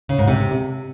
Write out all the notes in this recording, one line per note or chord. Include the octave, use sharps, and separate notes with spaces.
C#3
G#2
C3